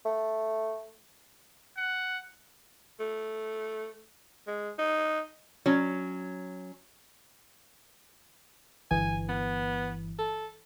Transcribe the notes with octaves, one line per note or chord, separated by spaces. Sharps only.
A3
F#5
A3
G#3
D#4
F#3 C#4
G1 E3 G#5
B3
A4